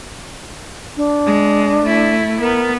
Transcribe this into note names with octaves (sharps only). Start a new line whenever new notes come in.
D4
G#3
A3 E4
B3 A#4